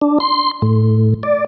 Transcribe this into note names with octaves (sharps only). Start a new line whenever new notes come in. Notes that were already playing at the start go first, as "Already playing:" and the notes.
D4
C6
A2
D5